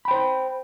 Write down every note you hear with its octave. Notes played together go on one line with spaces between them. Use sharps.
C5 G5 B5